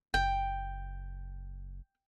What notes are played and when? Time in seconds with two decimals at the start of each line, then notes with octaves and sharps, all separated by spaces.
0.14 F#1 G5